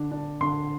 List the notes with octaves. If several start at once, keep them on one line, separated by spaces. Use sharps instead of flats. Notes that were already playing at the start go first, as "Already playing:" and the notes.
Already playing: D3 D4
D4
D3 C6